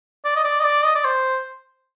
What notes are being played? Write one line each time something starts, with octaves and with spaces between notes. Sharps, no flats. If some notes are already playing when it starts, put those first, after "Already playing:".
D5
D#5
D5
D#5
D5
D#5
D5
C5